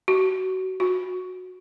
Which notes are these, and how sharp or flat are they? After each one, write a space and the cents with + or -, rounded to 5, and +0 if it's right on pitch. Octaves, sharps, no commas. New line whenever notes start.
F#4 +25
F#4 -10